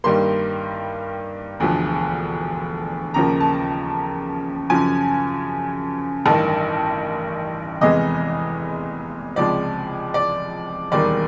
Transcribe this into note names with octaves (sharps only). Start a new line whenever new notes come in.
G2 D#3 G3 A#3 C6
E1 D2 D3 F3
D#2 C#3 F3 A#3 A#5
A5
F#2 C#3 F3 G#5
A1 G2 D#3 A5
F1 E2 C3 E3 G#3 D#5
C#2 C3 F3 G#3 D5
D5
E1 D#2 D#3 G3 D5